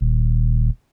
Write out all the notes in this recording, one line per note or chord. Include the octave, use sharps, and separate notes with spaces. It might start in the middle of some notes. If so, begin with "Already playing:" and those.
D#1